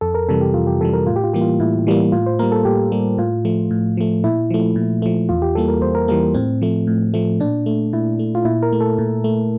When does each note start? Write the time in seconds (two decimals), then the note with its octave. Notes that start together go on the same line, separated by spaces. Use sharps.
0.01 F2 A4
0.15 A#4
0.29 C3 E3 G3 A4
0.41 G4
0.54 F2 F4
0.67 G4
0.81 C3 E3 G3 A4
0.94 A#4
1.07 A2 F4
1.16 G4
1.24 F4
1.34 E3 G3 A#3 G4
1.41 F4
1.60 A2 E4
1.87 E3 G3 A#3
2.12 A2 F4
2.26 C5
2.39 G3 A#3 A#4
2.52 A4
2.65 A2 G4
2.92 G3 A#3
3.18 A2 F4
3.45 F3 A3
3.71 A2
3.97 F3 A3
4.24 A#2 E4
4.50 F3 A3
4.76 A#2
5.02 F3 A3
5.29 E2 F4
5.42 G4
5.55 E3 G3 A#3 A4
5.68 A#4
5.82 E2 C5
5.95 A#4
6.08 E3 G3 A#3 A#4
6.34 A2 C4
6.62 F3 A3
6.87 A2
7.14 F3 A3
7.40 A#2 D4
7.66 A3
7.93 A#2 E4
8.19 A3
8.35 F4
8.45 A#2 E4
8.63 A#4
8.73 A3
8.81 A4
8.99 A#2
9.24 A3